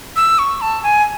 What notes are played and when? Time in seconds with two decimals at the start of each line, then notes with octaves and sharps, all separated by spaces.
0.16 E6
0.39 C#6
0.61 A5
0.83 G#5